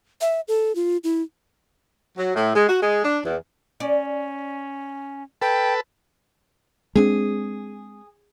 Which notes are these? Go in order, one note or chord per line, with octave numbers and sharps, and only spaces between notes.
E5
A4
F4
E4
F#3
A2
G#3
F#4
G#3
D4
E2
C#4 D5
A4 B4 G5
G#3 C4 D4 G#4